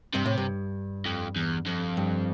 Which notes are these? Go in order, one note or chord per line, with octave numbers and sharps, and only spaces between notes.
G2 C3
A2
G2
F2
E2
F2
G2